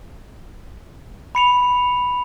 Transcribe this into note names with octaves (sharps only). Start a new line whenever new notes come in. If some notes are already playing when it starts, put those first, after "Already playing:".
B5 C#7 F7